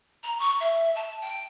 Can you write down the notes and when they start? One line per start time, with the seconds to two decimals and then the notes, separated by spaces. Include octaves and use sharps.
0.23 A#5
0.39 C#6
0.60 E5
0.95 A5
1.22 G5